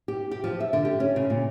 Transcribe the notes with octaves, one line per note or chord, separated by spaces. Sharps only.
G4
G4
F3
E5
D3
G4
C#4
C#3
A#2